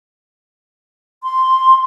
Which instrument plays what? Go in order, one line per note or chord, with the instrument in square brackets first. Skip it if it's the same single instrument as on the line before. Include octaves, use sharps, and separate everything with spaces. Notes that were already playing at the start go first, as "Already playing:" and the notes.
[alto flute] C6